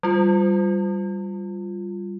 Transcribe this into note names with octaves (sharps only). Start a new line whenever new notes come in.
G3 F4